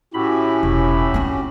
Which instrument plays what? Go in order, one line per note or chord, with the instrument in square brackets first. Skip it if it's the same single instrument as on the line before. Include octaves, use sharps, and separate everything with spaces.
[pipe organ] A2 B5 [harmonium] C#4 F#4 G4 [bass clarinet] E4
[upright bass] E1
B3 D4